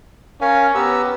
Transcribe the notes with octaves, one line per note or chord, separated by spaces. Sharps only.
C#4 A#4 F5 G#5
B3 G4 A#5 E6